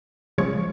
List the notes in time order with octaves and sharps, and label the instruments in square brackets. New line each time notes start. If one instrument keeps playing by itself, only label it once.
[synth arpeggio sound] C#3 F3 G#3 C#5